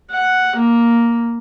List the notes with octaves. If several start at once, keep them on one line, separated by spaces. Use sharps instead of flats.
F#5
A#3